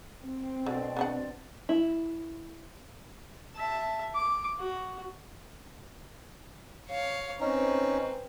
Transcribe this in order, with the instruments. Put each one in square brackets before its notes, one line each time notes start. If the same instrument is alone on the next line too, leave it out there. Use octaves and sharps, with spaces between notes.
[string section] C4
[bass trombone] B2 [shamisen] D3 [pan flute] D5
[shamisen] B3 D4 F#5
[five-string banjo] E4
[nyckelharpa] E5 A5
D6
F#4
[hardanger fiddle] C#5 F5
[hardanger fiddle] C4 B4 [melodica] C#4 D#4